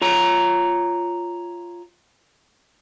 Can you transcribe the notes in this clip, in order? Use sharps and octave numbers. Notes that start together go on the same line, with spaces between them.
F4 C#5 A#5